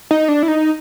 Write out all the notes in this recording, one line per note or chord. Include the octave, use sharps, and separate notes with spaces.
D#4
D4
E4
D#4